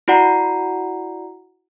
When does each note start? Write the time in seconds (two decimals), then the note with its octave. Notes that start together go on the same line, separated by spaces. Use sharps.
0.08 E4 F#4 D5 F#5 A#5 C7